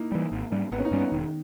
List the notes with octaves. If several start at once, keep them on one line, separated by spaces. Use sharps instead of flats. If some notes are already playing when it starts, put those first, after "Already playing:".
Already playing: A#3 D#4 E4
E3 G3
G#1
G#2 G3 C#4
G#1 B3
C#4
D#4
G2 G3 C#4
B3
E1 D#3